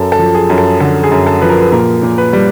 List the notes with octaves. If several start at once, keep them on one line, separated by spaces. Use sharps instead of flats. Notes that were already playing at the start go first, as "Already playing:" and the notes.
Already playing: F#2 A4
A4
F3
G#4
F#2
A4
D3 A4
G#4
F#2
A4
F3 B4
A#4
B4
A#2 A#4
A#2
B4
G3